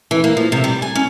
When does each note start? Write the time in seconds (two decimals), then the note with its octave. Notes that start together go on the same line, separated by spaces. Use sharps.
0.11 E3
0.24 A#3
0.37 F3
0.52 C3
0.64 G3
0.82 G#5
0.95 C#4